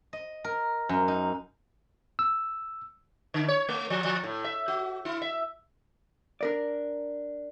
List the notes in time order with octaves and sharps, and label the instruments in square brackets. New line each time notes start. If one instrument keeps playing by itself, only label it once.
[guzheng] D#5
A#4
F#2
D#4
[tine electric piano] E6
[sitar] D3
C#5
A3
F3
F3
A2
E5
F#4
E4
E5
[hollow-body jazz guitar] D4 A#4 D5